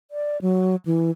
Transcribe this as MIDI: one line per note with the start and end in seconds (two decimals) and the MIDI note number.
0.11 0.40 74
0.42 0.76 54
0.86 1.11 52